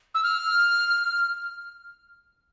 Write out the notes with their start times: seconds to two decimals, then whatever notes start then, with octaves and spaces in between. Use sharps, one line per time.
0.15 E6
0.23 F6